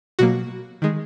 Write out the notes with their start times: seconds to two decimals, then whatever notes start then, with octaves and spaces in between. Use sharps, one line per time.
0.19 B2 F#3 A#3 F#4
0.82 D#3 G#3